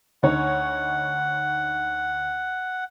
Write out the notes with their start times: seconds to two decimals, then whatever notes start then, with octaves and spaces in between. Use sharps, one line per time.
0.23 D2 D#4 C#5 F#5